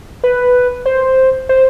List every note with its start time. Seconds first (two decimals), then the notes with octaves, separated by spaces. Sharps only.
0.24 B4
0.86 C5
1.49 C5